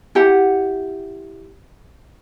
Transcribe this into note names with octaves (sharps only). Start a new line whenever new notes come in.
E4 G4 F#5